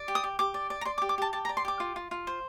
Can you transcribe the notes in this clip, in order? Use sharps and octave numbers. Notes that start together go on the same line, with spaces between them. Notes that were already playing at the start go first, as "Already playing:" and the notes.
Already playing: D5
G4
D#6
G4
G4 D6
D5
D5
A#5
D5 C6
D6
G4
D6
G4 A5
G4 A5
A#5
D5
C6
G4 D6
F4
F4
F4
C5